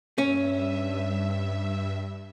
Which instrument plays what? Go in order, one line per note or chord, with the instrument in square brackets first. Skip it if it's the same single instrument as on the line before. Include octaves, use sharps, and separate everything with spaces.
[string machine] G2 E5 [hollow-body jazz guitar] C#4